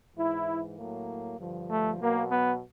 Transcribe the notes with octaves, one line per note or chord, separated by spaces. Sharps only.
G#2 E3 E4
A2 F#3 A#3
G2 D3 F3
A3
B2 F#3 A#3
B3